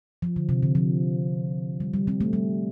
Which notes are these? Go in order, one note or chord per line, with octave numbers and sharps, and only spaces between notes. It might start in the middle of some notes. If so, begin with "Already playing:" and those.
F3
D3
C3
D3
F3
G3
G3
G3 C4
A3
G3